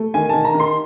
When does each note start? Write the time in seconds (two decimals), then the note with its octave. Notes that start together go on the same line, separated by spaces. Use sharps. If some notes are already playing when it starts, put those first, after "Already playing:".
Already playing: A3
0.14 D#3 G#5
0.29 D#3 A5
0.45 A#5
0.54 D#3
0.60 C6